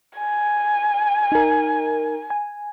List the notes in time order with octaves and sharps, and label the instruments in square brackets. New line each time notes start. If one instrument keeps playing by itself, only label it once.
[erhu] G#5
[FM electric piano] D#4 A#4
G#5